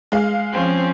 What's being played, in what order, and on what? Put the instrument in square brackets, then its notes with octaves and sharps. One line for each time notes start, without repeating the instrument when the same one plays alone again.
[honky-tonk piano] G#3 F5
[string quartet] F3 C4 C#4